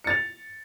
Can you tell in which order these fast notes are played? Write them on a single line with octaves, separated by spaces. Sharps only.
C#7 A6 F7